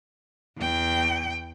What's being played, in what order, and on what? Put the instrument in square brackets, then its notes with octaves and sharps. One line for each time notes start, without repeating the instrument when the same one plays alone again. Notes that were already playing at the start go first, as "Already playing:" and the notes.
[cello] E2 G5